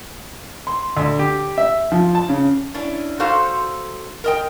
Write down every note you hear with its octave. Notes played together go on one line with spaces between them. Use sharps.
C6
D2
G4
E5
F3
A5
C#3
C#4 D4 E4
D#4 F#4 A4 C5 F5
A#4 D#5 G5